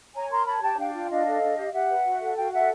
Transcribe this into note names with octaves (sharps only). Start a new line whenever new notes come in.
C#5 G#5 A#5
A#4 A#5 C6
C#5 A5 B5
G4 G5 A5
D4 F5 G5
F4
D4 D#5 F5
A4
D4
G4
G4 E5 F#5
B4
F#4
A4
F#4 F5 G5
A4 E5 F#5